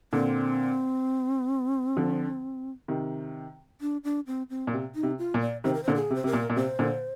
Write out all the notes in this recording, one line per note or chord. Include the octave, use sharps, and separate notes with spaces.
A#2 D3 C4
D3 F3
C3 D#3
D4
D4
C4
C4
A#2
C3
D#4
C3
F4
A#2
D5
C3 D#3 C5
A#4
C5
A#2 D3
G#4
C3
C5
C3 A#4
A#2
A#2
C3 C5
A#2 D3